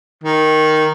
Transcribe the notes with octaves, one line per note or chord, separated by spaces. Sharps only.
D#3